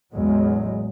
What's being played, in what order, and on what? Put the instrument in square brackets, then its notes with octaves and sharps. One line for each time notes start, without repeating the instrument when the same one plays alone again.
[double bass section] A1 E2 F#3 G#3